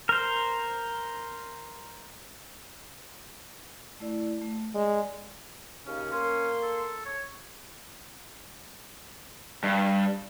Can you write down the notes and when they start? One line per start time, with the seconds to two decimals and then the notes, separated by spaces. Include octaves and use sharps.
0.09 A#4 C5
4.00 A3 E4 D5
4.42 A3
4.75 G#3 D5
5.86 D#2 C#3 C#4
6.12 A#3 C#4 C6
6.62 A4
7.05 C#5
9.63 G2